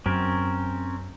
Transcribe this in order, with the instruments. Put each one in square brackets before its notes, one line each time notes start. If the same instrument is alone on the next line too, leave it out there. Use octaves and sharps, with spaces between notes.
[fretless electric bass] F#2 [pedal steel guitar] C4 C#4 A#4